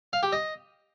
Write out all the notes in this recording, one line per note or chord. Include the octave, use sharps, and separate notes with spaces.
F5
G4
D#5